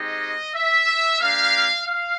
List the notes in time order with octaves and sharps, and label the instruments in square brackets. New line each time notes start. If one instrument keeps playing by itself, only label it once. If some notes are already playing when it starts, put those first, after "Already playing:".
Already playing: [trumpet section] G#3 C4 D#4 G4 D#5
E5
A#3 D4 G4 F5
F5